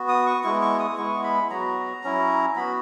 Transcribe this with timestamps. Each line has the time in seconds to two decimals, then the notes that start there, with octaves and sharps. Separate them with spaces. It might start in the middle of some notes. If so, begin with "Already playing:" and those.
Already playing: B3 F#4
0.09 D#6
0.27 C#6
0.44 G#3 B3 E4 C#6
0.62 C#6
0.79 D#6
0.97 G#3 B3 E4 C#6
1.23 B5
1.50 F#3 B3 F#4 A#5
2.04 F#3 C#4 E4
2.56 B3 F#4 B5